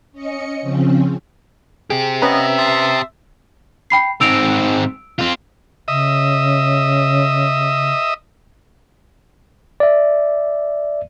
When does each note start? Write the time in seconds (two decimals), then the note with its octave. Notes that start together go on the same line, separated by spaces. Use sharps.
0.13 C#4 D#5 C#7
0.62 C#3 F3 C4 C#4
1.90 C4 G4 G#4
2.22 B3 C#4 B4 D#5 E5 A#5
2.58 A5 C6 D#6
3.90 G5 B5 C7
4.21 G#2 C4 E6 D7 F7
5.19 C4 F4
5.88 C#3 D#5 E5
9.80 D5 E5